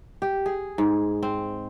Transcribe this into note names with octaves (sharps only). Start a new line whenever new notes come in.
G4
G#4
G#2
C4